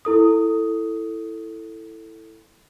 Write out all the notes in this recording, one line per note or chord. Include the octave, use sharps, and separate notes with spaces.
E4 A4 D#6